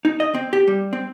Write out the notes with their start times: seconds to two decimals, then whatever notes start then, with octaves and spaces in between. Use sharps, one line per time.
0.05 D#4
0.20 D#5
0.34 C4
0.53 G4
0.68 G3
0.93 C4